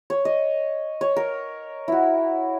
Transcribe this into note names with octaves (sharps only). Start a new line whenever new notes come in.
C#5
D#5
C#5
A#4
E4 F#4